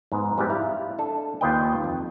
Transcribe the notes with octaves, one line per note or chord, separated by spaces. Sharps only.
G#2 G#3 B3
G#2 E3 G3 B3 C4 G4
E4 F5
D4 A4
D#2 F4 B4 D#5 G5
F2